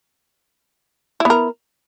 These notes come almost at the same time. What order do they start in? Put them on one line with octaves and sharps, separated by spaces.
E4 B3 A#4